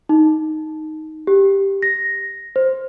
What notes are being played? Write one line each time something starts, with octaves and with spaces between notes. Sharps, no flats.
D#4
G4
A#6
C5